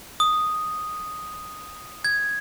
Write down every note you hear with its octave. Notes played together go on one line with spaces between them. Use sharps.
D#6
G#6